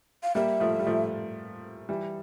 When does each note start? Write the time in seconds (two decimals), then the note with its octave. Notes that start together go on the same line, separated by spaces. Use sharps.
0.23 F5
0.35 G3 A#3 E5
0.60 F3 A3
0.79 G3
0.87 F3 A3
1.89 E3 G3